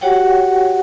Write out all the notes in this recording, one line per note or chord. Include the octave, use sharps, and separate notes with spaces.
F#4 G4 C#5 F#5 G5